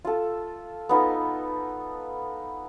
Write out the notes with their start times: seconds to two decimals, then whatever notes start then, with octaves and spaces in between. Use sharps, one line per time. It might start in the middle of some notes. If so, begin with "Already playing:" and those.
0.04 F4 A4
0.89 B3 D#4 F4 A4